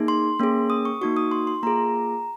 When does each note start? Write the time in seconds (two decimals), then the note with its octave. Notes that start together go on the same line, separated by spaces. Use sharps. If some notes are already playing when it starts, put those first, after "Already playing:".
Already playing: A#3 D#4 G#4
0.08 C6
0.39 A#3 C#4 G#4
0.70 D#6
0.85 C#6
1.01 A#3 D#4 F#4 C#6
1.17 D#6
1.31 C6
1.47 C6
1.63 A#3 F4 G#4 A#5